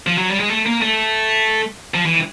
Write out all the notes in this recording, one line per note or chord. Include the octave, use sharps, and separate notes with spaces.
F3
F#3
G3
G#3
A3
A#3
A3
F3
E3